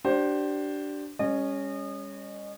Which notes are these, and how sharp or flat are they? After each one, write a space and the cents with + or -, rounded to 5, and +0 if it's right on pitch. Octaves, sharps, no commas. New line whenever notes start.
D4 +0 G4 -30 C5 +10
G3 +45 C#4 +0 D#5 -30